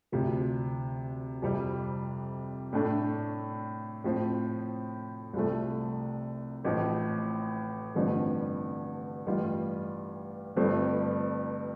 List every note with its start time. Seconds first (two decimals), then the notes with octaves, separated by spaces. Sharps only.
0.12 D2 C3 F3
1.42 F2 C3 G3
2.73 A2 A3 D4
4.04 A2 F3 C4
5.33 C2 C3 F3 A3
6.64 A1 A2 F3
7.95 A1 G2 D3 F3 C4
9.26 A1 G2 G3 F4
10.56 G1 G2 F3 A3 C4